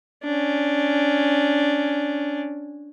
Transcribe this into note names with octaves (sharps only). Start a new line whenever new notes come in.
C#4 D4